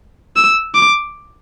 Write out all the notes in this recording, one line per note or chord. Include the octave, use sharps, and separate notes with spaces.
E6
D6